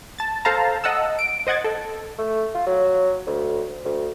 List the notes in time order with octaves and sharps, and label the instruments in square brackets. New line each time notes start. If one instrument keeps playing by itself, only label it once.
[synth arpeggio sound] A5 A6
A4 C5 F5 A5 A#5
D#5 F#5 A5 E6
D7
C5 D#5 F#5 G#6 A6
A4
[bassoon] A3
F4
F#3
D2
D2